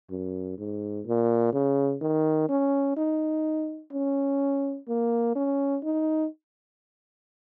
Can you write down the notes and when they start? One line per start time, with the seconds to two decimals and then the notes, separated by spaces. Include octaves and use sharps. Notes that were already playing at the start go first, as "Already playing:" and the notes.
0.11 F#2
0.58 G#2
1.06 A#2
1.53 C#3
2.01 D#3
2.49 C#4
2.97 D#4
3.92 C#4
4.88 A#3
5.35 C#4
5.83 D#4